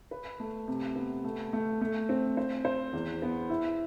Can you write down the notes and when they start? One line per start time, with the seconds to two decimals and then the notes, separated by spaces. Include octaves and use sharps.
0.11 B4
0.40 A3
0.68 C3
0.96 B3
1.24 A3
1.53 A3
1.81 A3
2.09 C4
2.37 C5
2.65 C5
2.93 E2
3.22 B3
3.49 E4